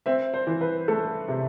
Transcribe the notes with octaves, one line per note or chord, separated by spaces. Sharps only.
C4 E5
C5
E3
B4
A3 A4
C3